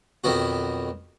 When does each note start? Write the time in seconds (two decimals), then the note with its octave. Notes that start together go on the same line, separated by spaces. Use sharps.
0.24 B1 F2 D#3 B3 F#4